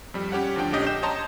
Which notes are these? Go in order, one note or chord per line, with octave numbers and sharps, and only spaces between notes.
F2 G3
C#4 G4 C#5 F#5
D2 F3 D4 G5
A#1 C#4 G4 D#5 G6
G6 E7
C#5 D#5 A5 A#5 C6